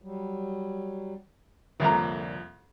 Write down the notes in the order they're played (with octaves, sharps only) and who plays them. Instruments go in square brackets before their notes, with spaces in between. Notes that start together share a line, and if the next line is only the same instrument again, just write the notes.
[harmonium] F#3 G3
[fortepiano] C2 F2 A#3 [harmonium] A#2 D3 [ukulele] C#5 E5 A#5